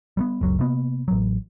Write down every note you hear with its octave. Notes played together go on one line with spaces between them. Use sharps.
G3 A3 B3
F#1 C#2 F#3
C3 A#3 B3
A1 F#3